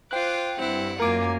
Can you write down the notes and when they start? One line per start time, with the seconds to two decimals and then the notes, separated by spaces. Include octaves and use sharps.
0.11 F4 C5 G5 D6 F#6
0.57 G2 C4 E4 F#5
1.00 F#2 A#3 F4 A#4 G#5 D6